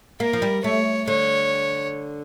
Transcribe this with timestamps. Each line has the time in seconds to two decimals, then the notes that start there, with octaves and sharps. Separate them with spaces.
0.20 A#3 A#4
0.33 F3
0.42 G3
0.64 A3 C#5
1.07 D3 C#5